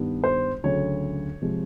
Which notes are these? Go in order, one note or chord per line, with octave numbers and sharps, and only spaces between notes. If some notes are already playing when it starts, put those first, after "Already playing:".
Already playing: G2 D#3 G3 B3 D4
C5
D2 C#3 F#3 C#5
C3 F3 G#3